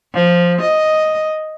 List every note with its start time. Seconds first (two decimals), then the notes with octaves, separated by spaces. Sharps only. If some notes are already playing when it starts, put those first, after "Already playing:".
0.15 F3
0.61 D#5